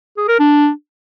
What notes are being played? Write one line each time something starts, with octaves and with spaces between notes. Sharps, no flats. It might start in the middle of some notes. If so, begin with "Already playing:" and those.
G#4
A#4
D4